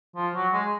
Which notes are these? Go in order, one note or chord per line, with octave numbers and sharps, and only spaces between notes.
F3
F#3
G#3